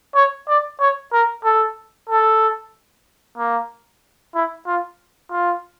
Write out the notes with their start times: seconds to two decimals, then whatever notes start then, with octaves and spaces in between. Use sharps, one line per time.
0.15 C#5
0.48 D5
0.80 C#5
1.13 A#4
1.44 A4
2.10 A4
3.38 A#3
4.35 E4
4.67 F4
5.32 F4